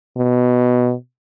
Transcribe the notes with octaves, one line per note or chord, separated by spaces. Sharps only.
B2